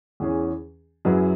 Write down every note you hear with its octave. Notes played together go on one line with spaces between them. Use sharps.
E2 E3 C#4 G#4
F#2 F#3 E4 G#4 B4